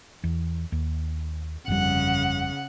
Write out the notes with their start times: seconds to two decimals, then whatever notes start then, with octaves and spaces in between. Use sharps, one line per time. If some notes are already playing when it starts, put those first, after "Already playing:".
0.24 E2
0.72 D#2
1.68 G1 F2 C#3 G3 F#5